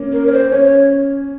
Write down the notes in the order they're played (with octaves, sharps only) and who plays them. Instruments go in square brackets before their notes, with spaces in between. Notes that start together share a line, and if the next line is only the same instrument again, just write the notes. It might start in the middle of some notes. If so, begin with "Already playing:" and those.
Already playing: [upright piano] A#3 C#4
[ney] A#4
C#5
C5
[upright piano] C#4 [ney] C#5